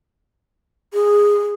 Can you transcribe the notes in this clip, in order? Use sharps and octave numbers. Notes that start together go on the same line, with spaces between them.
G#4